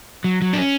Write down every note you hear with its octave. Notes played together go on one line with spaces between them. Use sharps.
F#3
F#3
D4
C#4